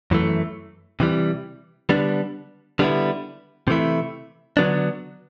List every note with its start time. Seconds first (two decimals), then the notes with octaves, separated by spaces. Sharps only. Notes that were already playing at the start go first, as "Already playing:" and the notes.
0.11 F#2 E3 A3
1.00 C3 E3 G3
1.89 D3 G3 B3 D4
2.79 D3 G3 B3 E4
3.68 C3 E3 A3 E4
4.57 D3 F#3 B3 D4